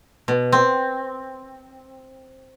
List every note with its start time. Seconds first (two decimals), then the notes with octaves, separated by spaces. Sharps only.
0.28 B2
0.52 C4